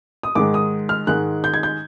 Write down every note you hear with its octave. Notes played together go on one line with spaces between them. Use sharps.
D#6
G#2 D#3 G#3 D6
D#6
F6
G#2 D#3 G#3 F#6
G6
G#6
G6